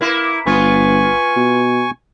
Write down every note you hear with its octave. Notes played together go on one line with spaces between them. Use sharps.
A#3 E4
G1 B3 F4 G#5 C#6
B2